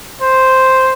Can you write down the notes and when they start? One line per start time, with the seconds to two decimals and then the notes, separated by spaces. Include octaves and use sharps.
0.22 C5